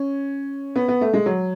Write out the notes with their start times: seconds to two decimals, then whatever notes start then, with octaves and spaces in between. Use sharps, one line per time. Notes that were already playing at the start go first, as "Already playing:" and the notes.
Already playing: C#4
0.76 B3
0.88 B3
1.01 A3
1.14 G#3
1.26 F#3